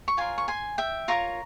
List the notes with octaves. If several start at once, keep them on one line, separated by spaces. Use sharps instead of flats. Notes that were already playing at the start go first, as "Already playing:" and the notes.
C#6
F4 A#4 C#5 G#5 C6
C#6
G#5 C6
E5 G5
F4 A#4 C#5 A#5 C#6